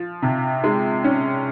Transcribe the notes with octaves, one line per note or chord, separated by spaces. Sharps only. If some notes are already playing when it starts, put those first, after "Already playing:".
Already playing: F3
C3
G#3
C#4